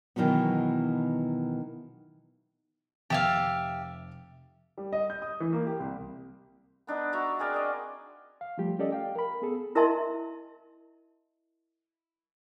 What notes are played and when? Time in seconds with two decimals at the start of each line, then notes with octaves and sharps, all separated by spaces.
0.16 B2 D#3 E3 F#3 B3
3.10 F1 G4 E5 F5 A6
4.78 G3
4.93 D#5
5.10 G6
5.22 D#6
5.40 E3
5.53 A#3
5.67 G4
5.80 C2
6.87 B3 D4 D#4 B4
7.13 F#4 E5 A#5
7.39 C4 G#4 A#4 D5
7.52 C5 D5 D#5
8.41 F5
8.58 F3 G3 A3 F4 G4
8.79 C#4 G4 A4 D5 D#5
8.92 F5 G5
9.16 A#4 B5
9.42 B3 G#4 A4
9.75 E4 A#4 D#5 E5 A5 C6